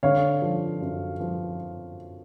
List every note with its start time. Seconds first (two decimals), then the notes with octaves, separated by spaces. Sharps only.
0.03 D3 C#5 F5
0.42 F3
0.81 F#2
1.20 F3